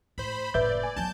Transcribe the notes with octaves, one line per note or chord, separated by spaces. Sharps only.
A2 C5 B5
F#1 A2 B4 D5 E5 G6
G#5
F#3 B3 A5 G6